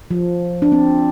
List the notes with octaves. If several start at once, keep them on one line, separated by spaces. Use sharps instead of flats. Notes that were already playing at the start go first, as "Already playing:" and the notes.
F3
D4
C4